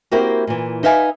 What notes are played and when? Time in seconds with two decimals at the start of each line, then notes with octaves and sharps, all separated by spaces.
0.11 A#3 C4 E4 F#4 G4 A#4
0.47 A#2 E3
0.83 D#4 B4 E5 F5 G#5